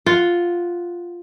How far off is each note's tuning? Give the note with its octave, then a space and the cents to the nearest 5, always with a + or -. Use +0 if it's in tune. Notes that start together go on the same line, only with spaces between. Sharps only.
F4 +0 F#5 +0